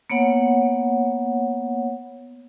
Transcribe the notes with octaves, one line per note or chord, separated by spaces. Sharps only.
A#3 B3 C#5 F#5